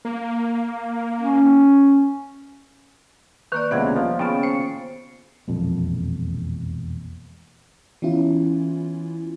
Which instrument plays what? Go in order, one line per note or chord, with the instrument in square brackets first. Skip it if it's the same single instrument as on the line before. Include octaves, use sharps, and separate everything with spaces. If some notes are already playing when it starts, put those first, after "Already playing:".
[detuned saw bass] A#3
[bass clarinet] C#4
[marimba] D#3 A#3 D5 [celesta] B4 C#6 F#6
[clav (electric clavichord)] C#2 C3 [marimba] B3 F#5 G#6
[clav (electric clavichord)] F3
[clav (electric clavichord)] C#3 F4 A5 [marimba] B3 C#4 [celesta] G5 D7
[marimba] C5 [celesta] C#7
[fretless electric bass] E1 A#1 F2
[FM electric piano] E3 B3 C#4 E4 F4